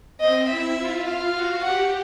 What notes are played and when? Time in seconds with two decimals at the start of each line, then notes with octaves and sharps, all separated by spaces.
0.20 C4 D#5
0.49 E4 E5
0.78 F4
1.07 F5
1.35 F#4
1.64 G4 F#5